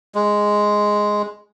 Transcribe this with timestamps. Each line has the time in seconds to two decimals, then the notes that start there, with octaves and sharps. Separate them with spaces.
0.15 G#3